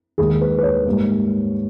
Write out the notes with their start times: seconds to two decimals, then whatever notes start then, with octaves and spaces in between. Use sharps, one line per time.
0.18 D#2 D#3 G#3 G#4
0.41 B4
0.58 B4
0.63 C#5
0.86 G#2 G3 A#3